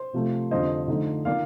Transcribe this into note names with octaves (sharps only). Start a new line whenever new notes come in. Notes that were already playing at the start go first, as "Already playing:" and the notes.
Already playing: C5
C3 F3 A3
F2 D3 G3 D4 F4 C5 D#5
D3 F3 A3 D#4
D#3 A#3 F4 D5 F5